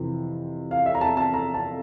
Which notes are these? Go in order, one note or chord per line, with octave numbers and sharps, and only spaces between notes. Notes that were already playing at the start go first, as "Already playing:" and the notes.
Already playing: F2 C3 E3
F5
E5
A#5
A5
A5
A#5
A5